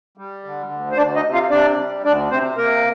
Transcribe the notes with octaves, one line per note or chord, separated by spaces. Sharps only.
G3
D3
D2
C5
D2 D4 D5
D#4 D#5
C3
F4 F5
C3 D4 D5
G3
D2 D4 D5
C3 C4 C5
C3 A#3 A#4